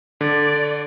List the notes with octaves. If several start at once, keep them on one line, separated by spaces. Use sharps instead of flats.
D3 D5